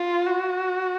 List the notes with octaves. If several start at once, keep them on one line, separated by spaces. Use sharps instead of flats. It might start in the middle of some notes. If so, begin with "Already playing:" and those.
Already playing: F4
F#4